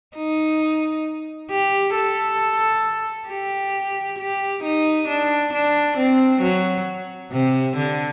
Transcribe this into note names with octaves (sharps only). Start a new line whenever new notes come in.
D#4
G4
A4
G4
G4
D#4
D4
D4
C4
F#3
C3
D3